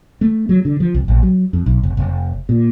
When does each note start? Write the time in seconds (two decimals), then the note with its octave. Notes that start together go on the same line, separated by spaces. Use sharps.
0.21 A3
0.49 F#3
0.65 D3
0.80 F3
0.94 C2
1.08 A#1
1.23 F#3
1.53 F2
1.66 B1
1.83 F1
1.97 F1
2.49 A#2